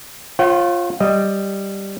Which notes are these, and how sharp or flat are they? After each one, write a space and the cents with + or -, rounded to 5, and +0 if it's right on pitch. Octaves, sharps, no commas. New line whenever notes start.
F4 +0 C#5 -40 F#5 +45
G3 +0 D#5 +0